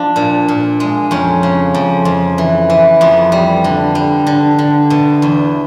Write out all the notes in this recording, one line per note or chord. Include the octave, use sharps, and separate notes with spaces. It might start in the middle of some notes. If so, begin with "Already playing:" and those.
Already playing: F3 D4
A#2
A#2
G#3
F2 C#4
C#3
F2
F2
E3
E3
F2 B3
G3
D3
G3
D3
D3
B2
E2